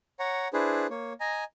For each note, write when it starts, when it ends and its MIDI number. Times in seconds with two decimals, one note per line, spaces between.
0.19 0.48 73
0.19 0.48 78
0.19 0.48 82
0.53 0.87 62
0.53 0.87 64
0.53 0.87 68
0.53 0.87 71
0.53 0.87 72
0.90 1.13 58
0.90 1.13 73
1.20 1.44 75
1.20 1.44 80
1.20 1.44 82